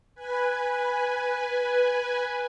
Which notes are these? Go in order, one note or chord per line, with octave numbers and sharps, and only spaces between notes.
B4 G#5